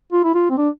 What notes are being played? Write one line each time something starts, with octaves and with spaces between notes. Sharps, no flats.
F4
E4
F4
C4
D4